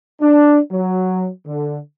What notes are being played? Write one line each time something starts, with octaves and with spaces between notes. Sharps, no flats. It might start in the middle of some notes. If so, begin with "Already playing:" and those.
D4
F#3
D3